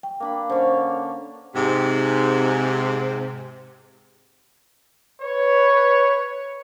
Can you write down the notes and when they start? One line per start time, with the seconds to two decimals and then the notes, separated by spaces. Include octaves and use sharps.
0.03 G5
0.20 A#3 D4 B5
0.50 D3 C#4 C5
1.55 G#2 C3
5.22 B4 C#5